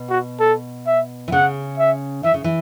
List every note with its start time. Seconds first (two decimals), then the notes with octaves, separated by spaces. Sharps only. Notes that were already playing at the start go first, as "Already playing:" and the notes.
Already playing: B2
0.10 F#4
0.40 A4
0.87 E5
1.28 E3
1.32 C#3 F#5
1.78 E5
2.24 E3 E5
2.34 C#3
2.44 E3